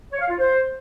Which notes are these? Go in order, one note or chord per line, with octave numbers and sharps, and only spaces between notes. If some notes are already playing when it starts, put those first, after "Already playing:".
C#5
F5
F4
C5